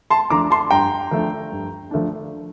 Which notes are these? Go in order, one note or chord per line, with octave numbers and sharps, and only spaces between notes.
A5 C6
F3 A3 D4 A#5 D6
A5 C6
G2 G5 A#5
F3 A3 D4
G2
F3 A3 D4